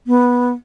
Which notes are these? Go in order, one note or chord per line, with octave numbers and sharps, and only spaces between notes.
B3